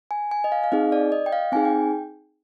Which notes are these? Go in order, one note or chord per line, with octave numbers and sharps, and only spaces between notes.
G#5
G#5
D#5
F5
F5
C4 D#4 G#4 D#5
D5
D#5
G5
F5
C4 D#4 G#4 G#5
G5